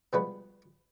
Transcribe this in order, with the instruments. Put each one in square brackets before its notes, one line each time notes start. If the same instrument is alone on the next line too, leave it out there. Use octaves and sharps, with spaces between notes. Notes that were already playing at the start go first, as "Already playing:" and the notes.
[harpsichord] B2 F3 G3 G#3 B3 B4